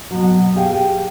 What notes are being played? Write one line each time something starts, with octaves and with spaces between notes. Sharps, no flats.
B2 F#3
G4 G#4 F5 G5 G#5